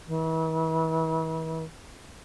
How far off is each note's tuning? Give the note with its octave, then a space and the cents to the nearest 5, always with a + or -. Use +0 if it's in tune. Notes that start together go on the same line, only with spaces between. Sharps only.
E3 -40